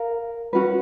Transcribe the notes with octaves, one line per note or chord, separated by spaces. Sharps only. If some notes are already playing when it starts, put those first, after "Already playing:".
Already playing: A#4 F5
C#4 F#4 B4